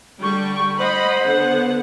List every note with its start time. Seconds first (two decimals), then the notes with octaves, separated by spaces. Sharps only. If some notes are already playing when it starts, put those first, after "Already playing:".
0.23 D3 G3 G5 C#6
0.79 C5 D#5 F#5 B5
1.26 D3 B3 F#5